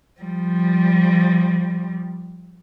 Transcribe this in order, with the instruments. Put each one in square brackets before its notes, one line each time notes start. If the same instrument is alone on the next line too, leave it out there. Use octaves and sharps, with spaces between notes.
[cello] F3 G3